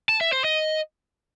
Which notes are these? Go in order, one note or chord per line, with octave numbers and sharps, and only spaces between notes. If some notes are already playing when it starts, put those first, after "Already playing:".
A5
E5
C5
D#5